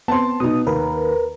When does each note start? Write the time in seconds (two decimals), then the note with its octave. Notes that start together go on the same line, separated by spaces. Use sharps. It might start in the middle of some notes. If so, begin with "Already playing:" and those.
0.08 B3 C4 A5 C6
0.40 B2 D#4 D#6
0.67 D#2 A#4 B4